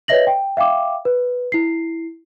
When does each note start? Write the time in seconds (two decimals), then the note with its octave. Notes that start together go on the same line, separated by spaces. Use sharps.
0.08 B4 C#5 D#5 E5 A#6 F#7
0.27 G5
0.57 E5 F5 G5 D6
1.05 B4
1.52 E4 C7